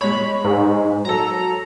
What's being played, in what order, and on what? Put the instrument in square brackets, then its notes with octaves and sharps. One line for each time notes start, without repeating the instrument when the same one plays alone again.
[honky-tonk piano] G#3 C#5 [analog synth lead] B5
[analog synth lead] G#2
[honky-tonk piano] F#3 A4 [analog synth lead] A#5